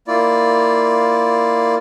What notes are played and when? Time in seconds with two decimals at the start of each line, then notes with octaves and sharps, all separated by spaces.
0.08 A#3 E4 F4 D5